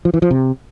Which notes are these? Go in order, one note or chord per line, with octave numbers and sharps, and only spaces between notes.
F3
E3
F3
C3